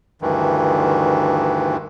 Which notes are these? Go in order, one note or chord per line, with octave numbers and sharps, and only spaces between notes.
D2 G2 D#3 E3